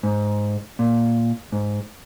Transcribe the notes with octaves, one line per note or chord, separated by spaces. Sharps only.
G#2
A#2
G#2